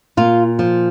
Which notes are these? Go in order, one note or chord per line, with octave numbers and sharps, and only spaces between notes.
A#2 F4
F3